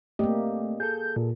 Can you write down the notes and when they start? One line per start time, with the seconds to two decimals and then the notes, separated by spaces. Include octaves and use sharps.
0.19 A3 A#3 C4 G4 D5 D#5
0.80 G#4 A4 G6
1.16 A#2